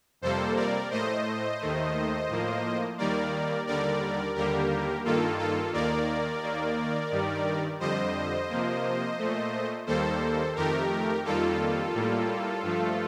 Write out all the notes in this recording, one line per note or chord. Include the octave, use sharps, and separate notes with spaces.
F2 C3 G3 A#3 A4 C5
A#4 D5
A2 A3 C5 D#5
D#2 D#3 A3
A2 F3 A#3
D#2 D#3 G3 A#3 A#4 D5
D#2 D3 G3 A#4 D5
D#2 D3 G3 A#3 G4 A#4
G2 D#3 A#3 F4 A4
F4 A4
D#2 D#3 A#3 A#4 D5
D#2 D#3 A#3
G2 D#3 G3
F2 D3 G3 C5 D#5
C3 F3 A#3
A#2 A3
D#2 D#3 G3 A#3 A4 C5
F2 D#3 A3 G4 A#4
F2 D#3 G3 A#3 F4 A4
A2 G3 A#3
G2 F3 A3